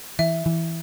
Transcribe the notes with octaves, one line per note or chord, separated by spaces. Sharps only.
E3 E5
E3